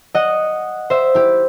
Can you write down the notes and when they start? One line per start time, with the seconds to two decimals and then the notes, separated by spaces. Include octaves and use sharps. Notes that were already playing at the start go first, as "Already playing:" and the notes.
0.15 D#5 F#5
0.90 C5 E5
1.15 E4 G4